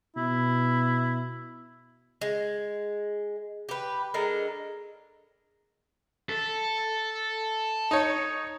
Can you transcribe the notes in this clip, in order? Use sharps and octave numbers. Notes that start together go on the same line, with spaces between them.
B2 E4
G#3
G4 B4
G#3 D4 A4 A#4
A4
D#4 C#5